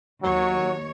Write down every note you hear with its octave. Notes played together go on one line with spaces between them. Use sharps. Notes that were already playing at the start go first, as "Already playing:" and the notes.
D#2 F#3 C#5